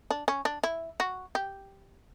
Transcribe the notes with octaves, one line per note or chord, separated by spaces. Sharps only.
D4
C#4
D4
E4
F#4
G4